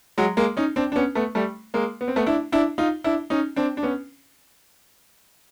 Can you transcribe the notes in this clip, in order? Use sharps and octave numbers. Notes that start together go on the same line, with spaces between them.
F#3 G#3
G#3 A#3
C#4 D#4
C4 D4
D4
B3 C#4
A3 B3
G3 A3
G#3 A#3
B3
C4
A3 B3
D4 E4
D4 E4
D#4 F4
D4 E4
C#4 D#4
C4 D4
D4
B3 C#4